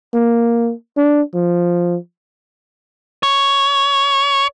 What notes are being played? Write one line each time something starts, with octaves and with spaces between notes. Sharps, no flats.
A#3
D4
F3
C#5